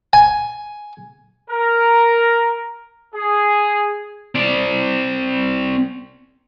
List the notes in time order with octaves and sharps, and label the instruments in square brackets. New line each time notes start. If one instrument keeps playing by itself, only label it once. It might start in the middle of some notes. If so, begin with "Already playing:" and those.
[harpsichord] G#5
[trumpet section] A#4
G#4
[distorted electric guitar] C4 D5